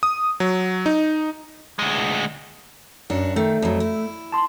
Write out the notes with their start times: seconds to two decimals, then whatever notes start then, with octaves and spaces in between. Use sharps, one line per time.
0.03 D#6
0.40 F#3
0.86 D#4
1.79 D2 G#3
3.10 F#2 D4 F#4
3.36 D#3 A3
3.62 F2 F#3
3.80 E4
4.32 A5 C6